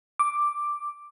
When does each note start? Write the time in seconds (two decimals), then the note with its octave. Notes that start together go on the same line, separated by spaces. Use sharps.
0.19 D6